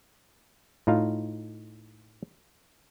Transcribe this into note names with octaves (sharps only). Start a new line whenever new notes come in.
A2 D#4 F4 F5